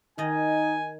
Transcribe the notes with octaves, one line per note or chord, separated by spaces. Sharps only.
D#3 D#4 D#5 G#5